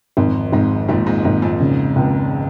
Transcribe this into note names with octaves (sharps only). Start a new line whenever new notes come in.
G#1 F2
G#1 G#2
G#1 F2 A#2
G#2
G#1 G#2
F2 A#2
C#3
C#2